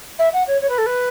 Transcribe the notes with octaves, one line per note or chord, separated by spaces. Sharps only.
E5
F#5
C#5
C#5
B4
A4
B4